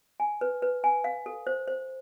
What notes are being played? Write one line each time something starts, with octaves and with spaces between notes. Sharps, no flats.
G#5
B4
B4
G#5
F5
A4
C5
C5